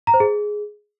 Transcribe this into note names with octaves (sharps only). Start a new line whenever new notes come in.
A#5
C5
G#4